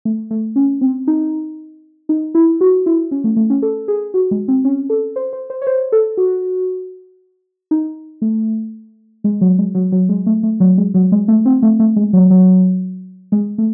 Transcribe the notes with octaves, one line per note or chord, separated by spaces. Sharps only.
A3
A3
C#4
C4
D#4
D#4
E4
F#4
E4
C#4
A3
A3
C#4
A4
G#4
F#4
G#3
C4
C#4
A4
C5
C5
C5
C#5
C5
A4
F#4
D#4
A3
G#3
F#3
G#3
F#3
F#3
G#3
A3
A3
F#3
G#3
F#3
G#3
A3
C4
A3
A3
G#3
F#3
F#3
G#3
A3